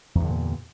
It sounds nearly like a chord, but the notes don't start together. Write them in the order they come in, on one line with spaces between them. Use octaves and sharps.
E2 G2 D3 A#2